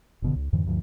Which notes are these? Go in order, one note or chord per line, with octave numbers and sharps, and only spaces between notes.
F#1 B2 D3
C#2
F2 G#2 D3 E3
D2 G2 F3